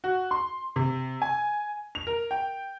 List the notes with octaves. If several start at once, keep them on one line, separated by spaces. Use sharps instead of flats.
F#4
C6
C3
G#5
F7
A#4
G5